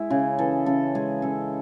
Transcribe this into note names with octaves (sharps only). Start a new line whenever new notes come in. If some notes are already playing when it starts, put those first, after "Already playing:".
Already playing: G#3 E4
C#3 G#4
E3 A4
C#3 A4
G#3 G#4
C#3 A4